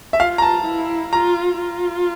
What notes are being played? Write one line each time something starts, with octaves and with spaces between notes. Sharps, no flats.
E5
F4 F5
A#5
A5
E4
F4 A#5
F4